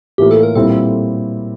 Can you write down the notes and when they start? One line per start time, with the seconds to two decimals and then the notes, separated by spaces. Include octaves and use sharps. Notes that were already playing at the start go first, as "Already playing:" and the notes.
0.18 A2 E3 A#3 F4 G4
0.31 A4
0.43 A#4
0.55 A#2 G3 C4 E4 A4